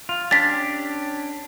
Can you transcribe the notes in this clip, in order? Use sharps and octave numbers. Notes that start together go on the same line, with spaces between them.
F4
C#4 D4 G4 A6 B6